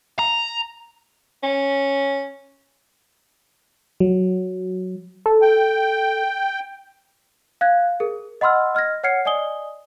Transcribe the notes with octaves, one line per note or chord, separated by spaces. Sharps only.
A#5
C#4
F#3
A4
G5
F5 F#6 G#6
G#4 A#4
D#5 F#5 B5 C6 E6 F6
D#5 F6 G#6 A#6
C#5 F#5 F6 G#6 C7 C#7
D5 D#5 G#5 D#6 G7